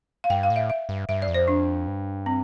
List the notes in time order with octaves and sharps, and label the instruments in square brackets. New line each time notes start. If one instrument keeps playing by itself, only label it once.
[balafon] F5
[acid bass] G2 [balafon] G5
[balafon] F5
[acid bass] A2
[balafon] E5
E5
[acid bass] G2
[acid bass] G2 [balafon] E5
[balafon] D5
[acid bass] F2
[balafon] C5
D4
[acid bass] G2
[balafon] C4